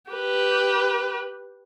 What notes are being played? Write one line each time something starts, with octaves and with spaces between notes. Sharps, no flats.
G4 B4